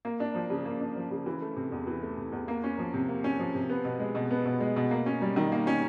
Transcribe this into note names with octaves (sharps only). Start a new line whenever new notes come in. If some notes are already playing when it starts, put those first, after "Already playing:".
A#3
D4
F3
C#3
A#3
D4
F3
C#3
E3
A3
C3
E2
E3
A3
C3
E2
A#3
C#4
F3
C3
A#3
C#4
F3
C3
B3
B2
G#3
B2
B3
B2
G#3
B2
A#3
C#4
G3
D#3
A#3
C#4